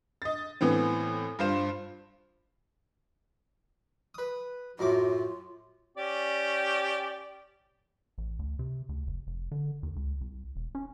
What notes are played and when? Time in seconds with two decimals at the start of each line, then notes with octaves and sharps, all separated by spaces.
0.22 D#5 A6
0.61 A2 E3 B3 C4
1.39 G2 F4 C5 E7
4.15 B4 D#6
4.79 F#2 A2 F4 D6
5.97 C#4 G4 D5
8.18 A1
8.39 D2
8.59 C3
8.89 D2
9.07 F1
9.27 F1
9.51 D3
9.83 D#2
9.96 C#2
10.21 C2
10.56 E1
10.75 C#4